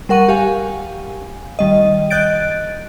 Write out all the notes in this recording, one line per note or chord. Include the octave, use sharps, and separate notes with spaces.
G3 A#4 F#5 C#6 D#7
G4 F5 G#5
D#3 G3 D#5
D#5 F#6 G6 A6 D7